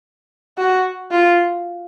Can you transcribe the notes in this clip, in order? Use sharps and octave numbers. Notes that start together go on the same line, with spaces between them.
F#4
F4